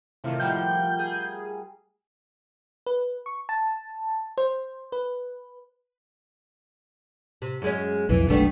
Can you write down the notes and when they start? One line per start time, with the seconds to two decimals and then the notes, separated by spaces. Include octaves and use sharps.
0.24 A2 C3 D#3 F4 A#4
0.40 F3 G3 F#5 G5 G6
0.99 G#4
2.86 B4
3.26 C#6
3.49 A5
4.38 C5
4.92 B4
7.42 C3
7.62 F#2 G#3 C#4
8.09 B1 F2 E3
8.29 F#1 B1 G3 A3 B3 D4